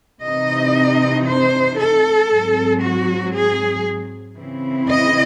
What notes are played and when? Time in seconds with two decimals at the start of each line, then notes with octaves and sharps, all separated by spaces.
0.22 C3 E3 C4 D#4 D#5
1.26 C5
1.78 A4
2.30 G#2 F#3 C4
2.81 F#4
3.33 G#4
4.37 C#3 E3 C4 E4
4.88 D#5